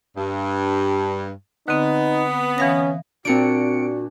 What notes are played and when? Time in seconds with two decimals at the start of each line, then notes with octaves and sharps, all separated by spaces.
0.16 G2
1.68 D3 B3 C4 D#4
2.58 E3 C#4 F5 A#6
3.25 A#2 C4 D4 F#4 C#7 D7